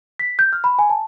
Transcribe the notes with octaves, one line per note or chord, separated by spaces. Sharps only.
B6
G6
F6
B5
G#5
A5